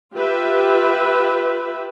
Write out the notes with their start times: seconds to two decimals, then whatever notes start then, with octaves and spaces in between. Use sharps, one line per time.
0.14 F4 G4 B4 E5